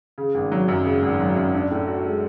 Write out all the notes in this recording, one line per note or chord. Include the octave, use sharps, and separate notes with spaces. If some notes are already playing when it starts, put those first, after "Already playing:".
C#3
G#1
F#3
F#2
C#3
G#1
F#3
F#2
D4
A2
F#4
G#3